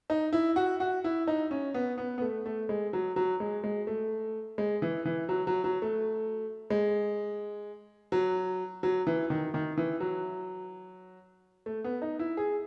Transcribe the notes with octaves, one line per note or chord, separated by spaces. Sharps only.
D#4
E4
F#4
F#4
E4
D#4
C#4
B3
B3
B3
A3
A3
G#3
F#3
F#3
G#3
G#3
A3
G#3
E3
E3
F#3
F#3
F#3
A3
G#3
F#3
F#3
E3
D#3
D#3
E3
F#3
A3
B3
D#4
E4
G#4